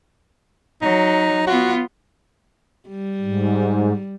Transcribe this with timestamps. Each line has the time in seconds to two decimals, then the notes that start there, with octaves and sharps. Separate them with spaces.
0.82 F#3 D#4
1.47 B3 F4 F#4
2.88 G3
3.21 G#2